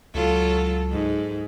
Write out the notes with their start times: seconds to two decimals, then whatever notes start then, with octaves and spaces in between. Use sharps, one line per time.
0.14 C#2 F#3 F4 A4
0.91 G#2